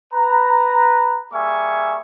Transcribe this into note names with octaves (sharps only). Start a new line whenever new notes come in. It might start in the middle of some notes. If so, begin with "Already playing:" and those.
B4 A#5
G3 A#3 G#4 E5 G#5 C#6